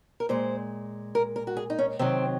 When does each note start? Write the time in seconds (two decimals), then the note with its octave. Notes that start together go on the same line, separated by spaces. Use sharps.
0.20 A#4
0.29 A#2 G#3 C5
1.15 A#4
1.36 A#4
1.47 F#4
1.57 G#4
1.70 D#4
1.79 C#4
1.99 C3 D#3 F#3 C4